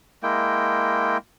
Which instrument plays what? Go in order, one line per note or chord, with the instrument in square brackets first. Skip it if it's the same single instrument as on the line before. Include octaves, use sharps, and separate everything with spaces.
[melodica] G#3 A#3 E4 G5